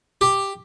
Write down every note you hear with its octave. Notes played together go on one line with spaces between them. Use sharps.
G4